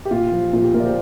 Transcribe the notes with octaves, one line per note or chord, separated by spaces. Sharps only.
G4
A#2 F4
F3
A#2 F4
G4
A#2 F4 A#4
D5
G4 C5